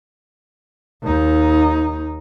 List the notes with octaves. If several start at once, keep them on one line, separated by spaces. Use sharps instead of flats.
D#2 D#4